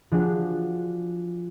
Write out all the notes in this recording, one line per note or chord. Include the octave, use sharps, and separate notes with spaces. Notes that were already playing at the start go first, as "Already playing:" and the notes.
F3 D4 F#4 G#4